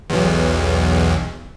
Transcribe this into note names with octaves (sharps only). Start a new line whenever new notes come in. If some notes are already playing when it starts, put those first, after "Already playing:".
B1 E2